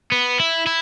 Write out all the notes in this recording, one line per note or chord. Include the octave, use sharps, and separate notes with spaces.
B3
E4
E4